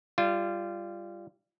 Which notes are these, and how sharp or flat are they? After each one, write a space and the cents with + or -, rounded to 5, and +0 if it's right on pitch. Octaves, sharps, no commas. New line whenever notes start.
G3 +0 F4 -20